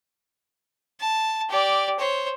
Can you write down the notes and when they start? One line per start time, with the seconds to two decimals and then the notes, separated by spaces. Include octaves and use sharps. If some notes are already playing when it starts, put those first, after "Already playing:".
1.00 A5
1.50 G4 D5
2.00 C5 C#5